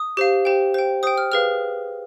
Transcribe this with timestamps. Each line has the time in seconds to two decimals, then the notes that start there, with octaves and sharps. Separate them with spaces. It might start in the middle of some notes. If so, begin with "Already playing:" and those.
Already playing: D#6
0.17 G4 C5 F5
0.45 G4 C5 G5
0.74 C5 G5
1.03 C5 G5 D#6
1.18 F6
1.32 G#4 B4 F5 F6